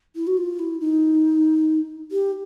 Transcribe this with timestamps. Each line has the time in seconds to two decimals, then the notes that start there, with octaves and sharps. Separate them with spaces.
0.15 E4
0.27 F#4
0.37 F4
0.59 E4
0.80 D#4
2.11 G4